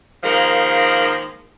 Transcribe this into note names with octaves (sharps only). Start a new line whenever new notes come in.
D#3 F3 G#3 A#3